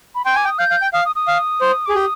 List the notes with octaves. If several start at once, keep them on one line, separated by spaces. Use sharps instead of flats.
B5
G5 C6
G#5 D6
G5
D#6
F5 G6
F5
G5
F5 D#6
D#6
D#6
F5
C5
G#4 D6
G4 D#6